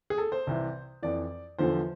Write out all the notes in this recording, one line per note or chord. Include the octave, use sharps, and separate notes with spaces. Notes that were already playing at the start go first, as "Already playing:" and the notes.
G#4
A4
C5
C2 C3 E3
F2 E3 D5
E2 D3 F3 C5